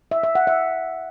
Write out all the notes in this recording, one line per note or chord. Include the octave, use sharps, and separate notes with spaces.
E5
E5
F#5
E5